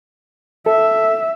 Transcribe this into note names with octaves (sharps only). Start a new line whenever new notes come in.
A4 E5